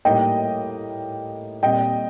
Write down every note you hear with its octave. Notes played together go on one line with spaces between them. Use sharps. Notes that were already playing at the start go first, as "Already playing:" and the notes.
A2 G3 A#3 D#4 D#5 G5
A#2 G3 C4 D#5 G5